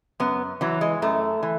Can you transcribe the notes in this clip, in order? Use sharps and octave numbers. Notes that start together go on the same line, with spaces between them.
F#2 B3
E3 F#3
G#3
F#2 A3
E3